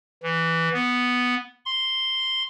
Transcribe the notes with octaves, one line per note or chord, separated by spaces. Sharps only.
E3
B3
C6